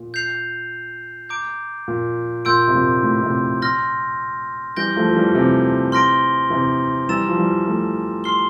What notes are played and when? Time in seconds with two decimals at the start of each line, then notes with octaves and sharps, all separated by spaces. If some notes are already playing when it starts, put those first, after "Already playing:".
Already playing: A#2
0.14 G6 C7 F7
1.29 A#5 D6 G6 D7
1.88 A#2
2.45 A#2 C6 E6 G6 D7
2.68 C3
2.75 A#2
3.03 A2
3.23 A2 C3
3.62 C6 F6 A#6
4.76 E3 G3 G6 A#6 D7 G7
4.96 F3 A3
5.09 F3
5.16 E3 G3
5.35 C3 E3
5.92 C6 F6 A#6 D7 G7
6.50 C3 E3
7.09 E3 G3 A#5 E6 A6 E7
7.28 F3
7.37 E3 G3
7.66 F3 A3
8.24 C6 F6 C7 G7